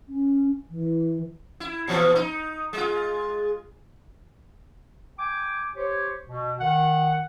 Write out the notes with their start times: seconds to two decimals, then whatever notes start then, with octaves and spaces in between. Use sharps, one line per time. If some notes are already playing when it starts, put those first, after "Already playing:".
0.08 C#4
0.70 E3
1.60 E4
1.88 A#2 E3 F3
2.15 D#4
2.73 G#3 F4
5.19 G5 G#5 D6
5.76 G4 C5 C#5
6.27 B2
6.60 D#3 F#5